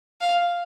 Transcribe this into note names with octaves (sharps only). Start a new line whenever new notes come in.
F5